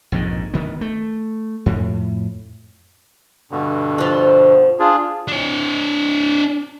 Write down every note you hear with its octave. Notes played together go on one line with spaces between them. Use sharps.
A#1 F2 G#2 D#3
D2 D#3 B3
A3
F2 A2
G2 B2 D3
F3 D4
D4 F4 G#4
D4 C#5